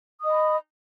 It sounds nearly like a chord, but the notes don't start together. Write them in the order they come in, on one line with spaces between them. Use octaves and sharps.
D#6 D#5 B5